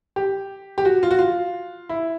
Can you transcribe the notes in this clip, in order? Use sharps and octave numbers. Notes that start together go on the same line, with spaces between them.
G4
G4
F#4
F4
F#4
F4
E4